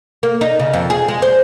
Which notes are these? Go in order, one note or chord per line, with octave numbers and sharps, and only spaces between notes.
A#3
D#4
C#3
F2
G#4
G#3
C5